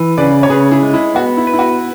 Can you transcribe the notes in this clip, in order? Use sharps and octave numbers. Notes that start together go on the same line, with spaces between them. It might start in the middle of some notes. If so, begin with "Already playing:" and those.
Already playing: E3
C#3 B4 D5
C#5
C#3 G#4 B4
E4 G#4
G#3
E4
B3 F#4
E4
B4
E4
F#4